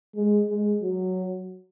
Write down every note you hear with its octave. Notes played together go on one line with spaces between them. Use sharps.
G#3
G#3
F#3